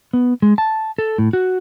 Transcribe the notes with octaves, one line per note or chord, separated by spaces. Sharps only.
B3
G#3
A5
A4
A2
F#4